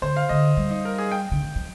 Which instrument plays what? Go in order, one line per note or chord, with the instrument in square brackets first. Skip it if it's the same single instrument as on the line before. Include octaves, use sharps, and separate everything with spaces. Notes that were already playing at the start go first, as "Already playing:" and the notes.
[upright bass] D3 [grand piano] C5
[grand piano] F5
[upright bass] D3 [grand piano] D#5
[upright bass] G3
[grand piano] D#4
A#4
G#4
G5
[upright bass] D3
D#3
F3